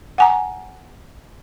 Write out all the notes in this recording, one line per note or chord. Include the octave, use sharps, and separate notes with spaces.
F#5 G#5 A#5